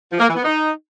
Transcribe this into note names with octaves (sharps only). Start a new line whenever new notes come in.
F3
A#3
E3
B3
D#4